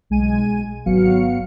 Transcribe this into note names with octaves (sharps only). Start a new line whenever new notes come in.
B1 G#3 G#5 D#7
G#1 F#3 B3 F#4 F5 C#7